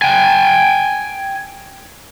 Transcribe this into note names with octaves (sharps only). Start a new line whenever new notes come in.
G5 G#5